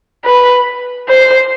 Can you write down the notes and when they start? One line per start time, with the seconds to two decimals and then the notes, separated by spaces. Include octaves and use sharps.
0.25 B4
1.09 C5